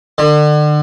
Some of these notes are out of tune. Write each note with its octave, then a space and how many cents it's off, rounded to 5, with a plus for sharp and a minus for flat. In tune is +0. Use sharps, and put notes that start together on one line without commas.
D3 +35